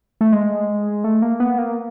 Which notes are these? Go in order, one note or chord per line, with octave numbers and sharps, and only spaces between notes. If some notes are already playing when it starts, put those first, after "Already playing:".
A3
G#3
A3
A#3
B3
A#3